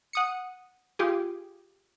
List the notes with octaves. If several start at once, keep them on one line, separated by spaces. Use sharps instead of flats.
F#5 D#6 C#7
F4 G4 G#4